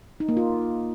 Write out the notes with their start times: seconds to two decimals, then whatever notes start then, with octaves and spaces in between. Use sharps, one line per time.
0.20 D#4
0.29 A#3
0.37 F4